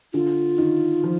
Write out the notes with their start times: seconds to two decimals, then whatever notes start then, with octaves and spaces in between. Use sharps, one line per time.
0.14 D3 F4
0.58 D#3
1.04 F3